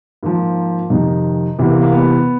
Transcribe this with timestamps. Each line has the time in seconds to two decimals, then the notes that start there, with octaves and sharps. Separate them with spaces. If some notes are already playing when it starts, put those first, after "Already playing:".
0.23 G#2 F3 A#3
0.90 F2 C3 D#3 D#4
1.58 E2 C3 E3 B3
1.70 A#3
1.82 A#3
1.93 B3